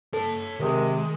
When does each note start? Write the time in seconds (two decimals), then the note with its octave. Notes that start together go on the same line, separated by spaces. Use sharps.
0.14 A4 C#5 A5
0.60 C3 D#3 G#3 A#4